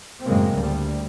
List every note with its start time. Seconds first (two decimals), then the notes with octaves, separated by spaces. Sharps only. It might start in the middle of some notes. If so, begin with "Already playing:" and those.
0.24 F#2 A2 C#3 G#3 A#3 C4
0.57 D2 G3